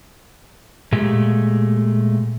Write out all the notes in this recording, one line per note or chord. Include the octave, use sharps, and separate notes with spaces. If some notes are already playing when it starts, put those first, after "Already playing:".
A#2 G#3 A3 G4